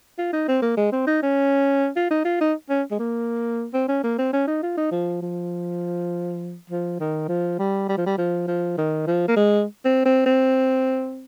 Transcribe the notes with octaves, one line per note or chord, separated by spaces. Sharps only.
F4
D#4
C4
A#3
G#3
C4
D#4
C#4
F4
D#4
F4
D#4
C#4
G#3
A#3
C4
C#4
A#3
C4
C#4
D#4
F4
D#4
F3
F3
F3
D#3
F3
G3
G3
F3
G3
F3
F3
D#3
F3
A#3
G#3
C4
C4
C4